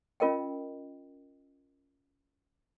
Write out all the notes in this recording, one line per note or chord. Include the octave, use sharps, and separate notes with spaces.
C#4 F4 A#4 D#5 G5